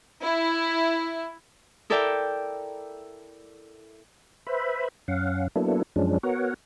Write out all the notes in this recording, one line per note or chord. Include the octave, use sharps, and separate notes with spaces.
E4
E4 A4 A#4 D5 E5 G5
B4 C5 E5 B5
F#2 C#4 F5 F#5
F#3 A#3 B3 D4 E4 A4
F#2 F3 G#3 C#4 D4
B3 F#4 A#4 C#5 F#5